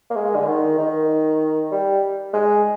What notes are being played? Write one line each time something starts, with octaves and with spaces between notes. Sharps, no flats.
A#3
G#3
D3
D#3
D#3
G3
G#3